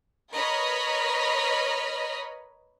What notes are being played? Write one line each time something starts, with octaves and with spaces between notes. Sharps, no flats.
A#4 B4 C#5 D#5 B5 F6